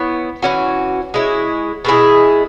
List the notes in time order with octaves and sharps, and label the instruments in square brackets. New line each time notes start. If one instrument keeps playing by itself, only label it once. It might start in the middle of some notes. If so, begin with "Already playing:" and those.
Already playing: [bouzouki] B3 E4 C#5
E3 C#4 F#4
G#3 E4 C#5
B2 G#3 E4 G#4